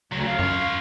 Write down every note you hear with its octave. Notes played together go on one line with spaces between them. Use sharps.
D2 C#3 F#3
F5
F#2 F4 C#5